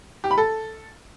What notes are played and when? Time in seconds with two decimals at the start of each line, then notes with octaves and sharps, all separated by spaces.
0.24 G4
0.31 B5
0.38 A4